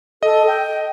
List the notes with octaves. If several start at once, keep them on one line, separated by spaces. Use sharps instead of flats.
A4 D#5
G5